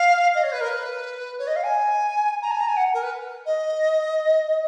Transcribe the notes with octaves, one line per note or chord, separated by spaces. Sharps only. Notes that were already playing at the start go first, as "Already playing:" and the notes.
Already playing: F5
D#5
C#5
B4
A#4
B4
C#5
D#5
F5
G#5
A#5
G#5
A#5
G#5
F#5
A#4
B4
D#5